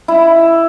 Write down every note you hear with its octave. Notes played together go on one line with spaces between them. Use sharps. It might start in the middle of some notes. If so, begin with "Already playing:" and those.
E4